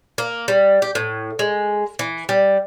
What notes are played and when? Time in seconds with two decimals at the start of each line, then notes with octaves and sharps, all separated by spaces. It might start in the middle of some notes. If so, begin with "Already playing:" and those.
0.18 A#3
0.48 G3
0.82 G4
0.95 A2
1.39 G#3
1.99 E3
2.29 G3